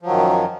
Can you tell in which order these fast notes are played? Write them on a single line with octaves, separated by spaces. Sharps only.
F3 F#3 D#3 F#2